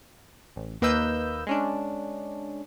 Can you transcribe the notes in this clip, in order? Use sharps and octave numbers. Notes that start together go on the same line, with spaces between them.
A1
D#2 A#3 B4 D#5 E6 G6
G#3 C#4 D4